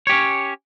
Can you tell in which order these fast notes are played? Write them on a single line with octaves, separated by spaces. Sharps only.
C#5 G4 C#4